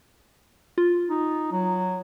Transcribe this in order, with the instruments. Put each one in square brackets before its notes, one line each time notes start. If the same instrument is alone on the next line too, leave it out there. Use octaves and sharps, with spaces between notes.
[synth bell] F4
[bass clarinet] D#4
F#3